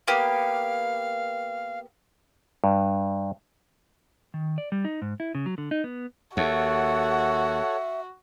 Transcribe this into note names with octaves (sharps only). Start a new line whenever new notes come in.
A#3 B3 G4 F5
G2
D#3
D5
G3
D#4
G#2
E4
C#3
F#3
D3
D#4
B3
D#2 F#4 A4 C#5 E5 F#5